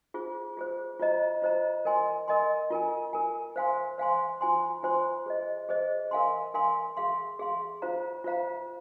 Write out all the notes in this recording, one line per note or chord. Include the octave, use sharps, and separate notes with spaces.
F4 G#4 C5
F4 G#4 C5
F4 C5 D#5 A#5
F4 C5 D#5 A#5
A#4 D#5 G#5 C6
A#4 D#5 G#5 C6
F4 A#4 G#5
F4 A#4 G#5
C5 F5 G#5 C6
C5 F5 G#5 C6
F4 C5 G#5 C6
F4 C5 G#5 C6
G#4 C5 D#5
G#4 C5 D#5
A#4 F5 G#5 C6
A#4 F5 G#5 C6
G#4 F5 C6
G#4 F5 C6
F4 C5 F5 A#5
F4 C5 F5 A#5